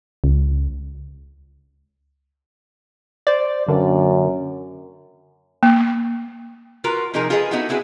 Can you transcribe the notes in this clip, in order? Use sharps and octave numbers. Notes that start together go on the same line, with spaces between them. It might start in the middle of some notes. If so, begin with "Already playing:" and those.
C#2
C5 D5
F#2 D3 A#3
A#3
F4 F#4 A#4 B4
C3 F3 D#4 G#4 A#4
F4 G#4 A4 B4 C5 D#5
B3 D#4 E4 F#4 A4
C4 E4 F#4 G#4 B4